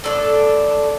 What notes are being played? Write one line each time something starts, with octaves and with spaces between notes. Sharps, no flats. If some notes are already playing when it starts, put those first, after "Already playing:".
A2 D4 A4